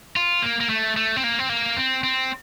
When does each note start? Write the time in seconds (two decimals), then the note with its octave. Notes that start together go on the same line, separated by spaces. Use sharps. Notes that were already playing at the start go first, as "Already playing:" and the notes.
0.16 F4
0.42 A#3
0.60 A#3
0.69 A3
0.96 A3
1.16 C4
1.24 A#3
1.39 C4
1.49 A#3
1.77 C4
2.03 C4